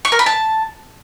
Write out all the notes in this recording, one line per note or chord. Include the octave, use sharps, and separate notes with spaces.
C#6
A#4
B5
A5